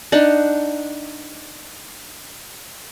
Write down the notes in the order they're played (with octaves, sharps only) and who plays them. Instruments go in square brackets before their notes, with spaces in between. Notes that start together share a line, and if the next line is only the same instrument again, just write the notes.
[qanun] D4 D#4 F#5